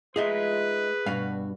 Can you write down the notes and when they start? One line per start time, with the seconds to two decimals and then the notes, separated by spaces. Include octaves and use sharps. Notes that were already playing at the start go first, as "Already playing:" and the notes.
0.16 G#3 D#4 F4 G#4 B4 E5
1.06 G2 B2 F#4 F5